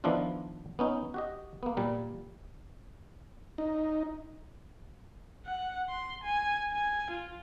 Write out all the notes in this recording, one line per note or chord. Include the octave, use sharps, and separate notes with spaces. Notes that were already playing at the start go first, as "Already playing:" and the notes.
D#3 F3 B3 D4 E4 F4
B3 C#4 D#4
F#4 G4 D#5
A#3 B3
A#2 G3 A#4
D#4
F#5
C6
G#5
G#5
F4